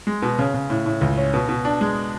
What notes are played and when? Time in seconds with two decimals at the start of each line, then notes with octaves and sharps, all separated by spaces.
0.07 G#3
0.22 B2
0.39 C#3
0.54 C#3
0.70 A2
0.86 A2
1.01 C#2
1.18 C#4
1.34 B2
1.49 B2
1.65 D4
1.81 G#3